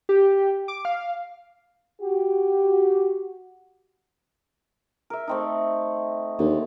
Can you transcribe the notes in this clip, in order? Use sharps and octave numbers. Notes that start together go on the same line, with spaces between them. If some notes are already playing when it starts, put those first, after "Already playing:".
G4
D6
F5
F#4 G4
A#4 E5
A3 C4 D#4
D#2 D3